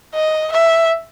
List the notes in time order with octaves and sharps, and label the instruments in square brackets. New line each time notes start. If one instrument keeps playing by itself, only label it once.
[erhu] D#5
E5